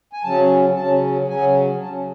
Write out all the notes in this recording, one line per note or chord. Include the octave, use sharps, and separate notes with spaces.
G#5
C#3 F#3 C#4 A5
C#3 F#3 C#4 A5
C#3 F#3 C#4 G#5
C#3 F#3 C#4 A5